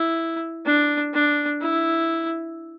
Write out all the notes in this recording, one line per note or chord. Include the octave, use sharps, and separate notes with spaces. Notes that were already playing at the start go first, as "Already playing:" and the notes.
Already playing: E4
D4
D4
E4